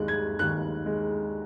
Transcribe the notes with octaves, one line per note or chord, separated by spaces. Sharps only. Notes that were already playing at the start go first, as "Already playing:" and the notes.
Already playing: D#2 G#3 F#6
G#6
D#2 F#6
G#3